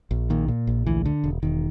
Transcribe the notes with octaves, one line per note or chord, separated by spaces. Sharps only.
A#1
A#2 D#3
A#2
A#1
D2 E3
D3
E1
E1 D#3